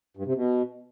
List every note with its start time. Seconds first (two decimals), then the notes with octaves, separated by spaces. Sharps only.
0.17 G2
0.26 C3
0.35 B2